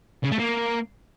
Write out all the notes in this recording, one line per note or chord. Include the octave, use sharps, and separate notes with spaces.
C#3
A3
A#3